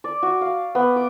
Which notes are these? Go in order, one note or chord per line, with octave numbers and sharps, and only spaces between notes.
D5
F#4
F5
B3
D6